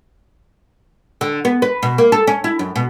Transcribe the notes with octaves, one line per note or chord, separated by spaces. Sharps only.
D3
B3
B4
B2
A#3
A4
C#4
E4
F#2
B2